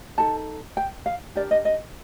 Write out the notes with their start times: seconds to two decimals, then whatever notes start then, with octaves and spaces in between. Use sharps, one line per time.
0.18 D#4 A4 A5
0.77 G5
1.06 F5
1.35 D4 G4 A#4 D5
1.51 D#5
1.65 D#5